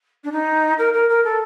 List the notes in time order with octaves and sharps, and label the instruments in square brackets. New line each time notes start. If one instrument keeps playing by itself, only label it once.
[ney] D4
D#4
A#4
A#4
A#4
A4